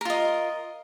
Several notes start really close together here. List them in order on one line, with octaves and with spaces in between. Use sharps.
A#4 F4 D#5